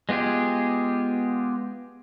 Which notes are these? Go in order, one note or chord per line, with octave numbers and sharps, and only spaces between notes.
G#3 B3 F4 G4 G#4